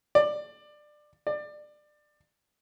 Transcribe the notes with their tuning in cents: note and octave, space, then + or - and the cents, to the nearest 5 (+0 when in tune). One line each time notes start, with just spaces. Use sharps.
D5 +20
D5 +25